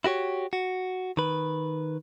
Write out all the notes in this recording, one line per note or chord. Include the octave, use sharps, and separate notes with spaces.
E4 F#4 G4 C#5
F#4
D#3 B4